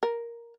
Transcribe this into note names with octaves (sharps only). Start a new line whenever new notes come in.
A#4